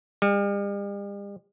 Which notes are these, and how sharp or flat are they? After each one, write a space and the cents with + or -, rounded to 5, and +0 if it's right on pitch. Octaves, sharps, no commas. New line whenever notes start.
G3 +45